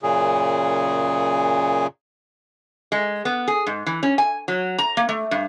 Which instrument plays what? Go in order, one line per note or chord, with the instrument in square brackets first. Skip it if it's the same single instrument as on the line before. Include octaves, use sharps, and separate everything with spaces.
[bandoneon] F#2 A#2 C#3 G#4
[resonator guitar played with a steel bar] G#3
B3
G#4
G#2
E3
C#4
G#5
F#3
A#5
A#3
A3
G2